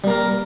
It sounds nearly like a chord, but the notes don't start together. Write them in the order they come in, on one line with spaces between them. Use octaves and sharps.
G3 A#3 A#4